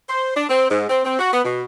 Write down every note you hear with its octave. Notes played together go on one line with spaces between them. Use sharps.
C5
D4
C4
G#2
C4
C4
F#4
B3
B2